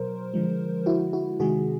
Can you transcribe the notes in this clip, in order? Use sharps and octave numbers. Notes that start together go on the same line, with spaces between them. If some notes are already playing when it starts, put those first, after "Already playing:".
Already playing: B2 F#3 A#4 C5
D3 F3 G#3
E4 F#4
E4 F#4
C3 D#3 G#3 F#4 G#4